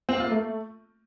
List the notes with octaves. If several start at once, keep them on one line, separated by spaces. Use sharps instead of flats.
C4
A#3
F4
A#3
A3